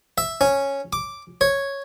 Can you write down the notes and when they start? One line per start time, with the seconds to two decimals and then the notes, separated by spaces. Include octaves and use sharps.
0.18 E5
0.41 C#4
0.93 D6
1.41 C#5